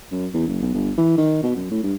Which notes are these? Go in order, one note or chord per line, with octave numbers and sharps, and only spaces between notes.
F#2
E2
F#1
B1
G1
E3
D#3
B2
F#2
A2
G2